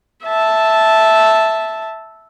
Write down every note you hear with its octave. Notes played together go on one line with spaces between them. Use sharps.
E5 A5